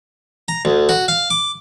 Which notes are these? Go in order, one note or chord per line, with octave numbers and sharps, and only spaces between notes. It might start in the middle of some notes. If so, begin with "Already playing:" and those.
A#5
D2
F#4
F5
D6